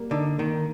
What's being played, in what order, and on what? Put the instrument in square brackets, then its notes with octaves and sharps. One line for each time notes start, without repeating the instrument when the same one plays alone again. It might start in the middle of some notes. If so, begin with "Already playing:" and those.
Already playing: [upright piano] G3 A#3
[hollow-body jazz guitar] D3 [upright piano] D#4
[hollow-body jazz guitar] D#3 [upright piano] A#3